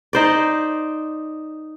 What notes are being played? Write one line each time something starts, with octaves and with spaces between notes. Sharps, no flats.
D#4 C5 D5